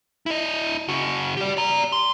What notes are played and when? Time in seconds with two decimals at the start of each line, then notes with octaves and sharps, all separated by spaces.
0.26 E4 D#5
0.89 C#3 F#4
1.37 G4 D5
1.57 D5 A#5
1.92 C6